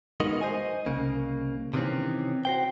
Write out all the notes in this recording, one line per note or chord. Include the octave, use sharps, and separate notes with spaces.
G#3 B3 D#4 F#4 A#4 D#5
C5 D#5 G#5
C2 C#3 A#3
C3 D#3 E3 G3 C4 C#4
F#4 C5 G5